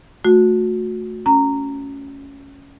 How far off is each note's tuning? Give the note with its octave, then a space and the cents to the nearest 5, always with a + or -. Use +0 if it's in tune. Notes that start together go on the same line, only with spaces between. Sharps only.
A3 +0 F#4 -25
C#4 +5 A#5 -15